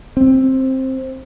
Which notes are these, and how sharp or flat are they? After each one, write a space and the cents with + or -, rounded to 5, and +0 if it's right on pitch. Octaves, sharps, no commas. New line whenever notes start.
C4 +10